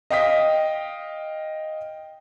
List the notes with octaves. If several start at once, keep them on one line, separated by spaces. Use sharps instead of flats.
D#5 F5 G5 D#6 B6